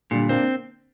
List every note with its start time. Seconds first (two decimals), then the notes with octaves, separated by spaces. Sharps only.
0.11 A#2 D3 G3
0.29 A#3 C4 D4